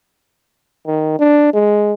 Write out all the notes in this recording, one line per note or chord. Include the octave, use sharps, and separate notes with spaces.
D#3
D4
G#3